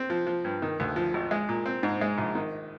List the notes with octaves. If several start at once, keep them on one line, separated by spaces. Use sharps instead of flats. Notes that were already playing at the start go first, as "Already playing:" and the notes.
Already playing: C4
F3
F3
G2
D#3
D2
F3
G#1
G#3
A#2
C4
G#2
G#3
A#1
D#3